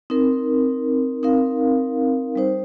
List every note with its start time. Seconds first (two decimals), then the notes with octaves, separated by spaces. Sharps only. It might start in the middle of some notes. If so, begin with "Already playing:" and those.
0.10 C4 D#4 A#4
1.23 C4 D#4 A#4 F5
2.36 G3 D#4 C5